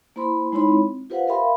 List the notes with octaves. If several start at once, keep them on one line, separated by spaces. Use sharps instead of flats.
A#3 E4 C5 B5 C6
G#3 D#4 E4 C#5 B5 C6
C4
F4 G4 B4 C5 F5 F#5
A#4 E5 F5 G5 B5 C6